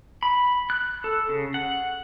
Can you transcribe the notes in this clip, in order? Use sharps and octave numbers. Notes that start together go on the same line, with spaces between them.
B5
F#6
A4
C#3
F#5